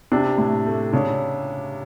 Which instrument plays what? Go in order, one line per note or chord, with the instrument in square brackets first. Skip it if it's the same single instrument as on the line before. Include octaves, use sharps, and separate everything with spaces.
[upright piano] C3 [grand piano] D4
[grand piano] A2
A3
[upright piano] C#3 [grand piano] D4